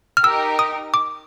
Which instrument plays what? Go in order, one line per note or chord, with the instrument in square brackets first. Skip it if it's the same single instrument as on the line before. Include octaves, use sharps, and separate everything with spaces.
[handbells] F6
[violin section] D#4 G4 A#4 [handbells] E6
[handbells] D#6
D6